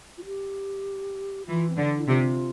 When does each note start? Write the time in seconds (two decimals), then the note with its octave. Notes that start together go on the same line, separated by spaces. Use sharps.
0.18 F4
0.26 G4
1.47 E3 F4
1.70 C4
1.77 D3 D4
1.98 E4
2.08 C3 F4